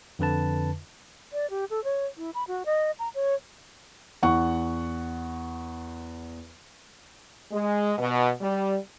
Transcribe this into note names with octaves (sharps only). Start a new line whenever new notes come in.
F2 D3 B4 A5
D5
G4
A4
C#5
E4
B5
F#4
D#5
A#5
C#5
E2 F#5 C#6
G#3
B2
G3